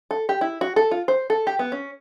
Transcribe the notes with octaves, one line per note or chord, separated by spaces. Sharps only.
A4
G4
E4
F#4
A4
F4
C5
A4
G4
B3
C#4